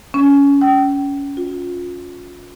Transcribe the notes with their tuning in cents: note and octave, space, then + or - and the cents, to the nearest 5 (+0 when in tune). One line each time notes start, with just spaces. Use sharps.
C#4 +20
G5 -30
F4 +30